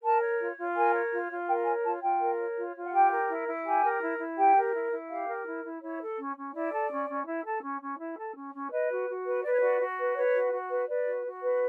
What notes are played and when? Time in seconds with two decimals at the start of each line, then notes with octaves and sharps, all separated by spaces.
0.03 A#4 A5
0.21 C#5
0.39 F4
0.57 F4
0.75 A#4 G#5
0.93 C#5
1.11 F4
1.29 F4
1.47 A#4 G5
1.65 C#5 G#5
1.84 F4 A5
2.01 F4 G5
2.20 A#4
2.38 C#5
2.56 F4
2.74 F4
2.84 F#5
2.92 G4 G5
3.10 A#4
3.28 E4
3.47 E4
3.64 G4 G#5
3.83 A#4
4.00 E4
4.18 E4
4.36 G4 G5
4.55 A#4
4.73 E4
4.91 E4
5.09 G4 F5
5.27 A#4
5.46 E4
5.64 E4
5.82 E4 C#5
6.00 A4
6.17 C#4
6.36 C#4
6.54 E4 D5
6.72 A4
6.91 C#4
7.08 C#4
7.26 E4
7.45 A4
7.62 C#4
7.81 C#4
7.98 E4
8.17 A4
8.35 C#4
8.53 C#4
8.71 B4 D#5
8.90 F#4
9.07 F#4
9.25 B4
9.43 B4 D5
9.52 C#5
9.61 F#4 D5
9.79 F#4
9.98 B4
10.16 B4 C#5
10.34 F#4
10.52 F#4
10.70 B4
10.88 B4 D5
11.06 F#4
11.25 F#4
11.42 B4